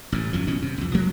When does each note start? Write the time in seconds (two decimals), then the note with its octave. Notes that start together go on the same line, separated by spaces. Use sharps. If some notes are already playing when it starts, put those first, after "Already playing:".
0.12 A1 A2
0.33 G#1 F#2 F3
0.47 B2 E3 C#4
0.62 C3
0.78 C2 F2
0.94 F3 G#3 A#3